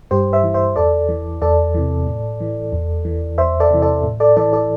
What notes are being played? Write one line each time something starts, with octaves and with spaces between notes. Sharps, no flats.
G2 G4 C5
C5 E5
E3
C5 E5
E2 A4 D5
E3
E2 A4 D5
C3 E3
A2
E3
E2
E3
E2 C5 E5
A4 D5
C3 E3
A4 D5
A2
A4 D5
E3 A4 D5
A4 D5